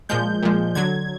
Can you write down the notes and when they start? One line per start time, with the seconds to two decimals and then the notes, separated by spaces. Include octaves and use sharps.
0.09 A#2 F3 G#3 G6
0.43 A#2 F3 G#3
0.75 D3 F#3 G#6